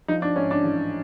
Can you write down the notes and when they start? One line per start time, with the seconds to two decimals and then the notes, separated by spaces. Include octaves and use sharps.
0.08 F3 D#4
0.22 D4
0.36 G#2 C#4
0.51 D4
0.64 A1